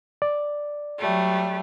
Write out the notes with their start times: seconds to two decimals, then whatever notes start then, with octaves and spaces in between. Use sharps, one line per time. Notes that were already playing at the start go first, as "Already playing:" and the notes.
0.22 D5
1.00 F#3 G3 A3